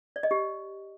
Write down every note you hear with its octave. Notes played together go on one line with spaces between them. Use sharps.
D5
D#5
G4